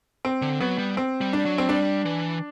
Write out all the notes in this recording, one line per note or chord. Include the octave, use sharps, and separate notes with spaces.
C4
D3
F#3 B3
G3
C4
G3
D4
F#3
C4
G3 D4
E3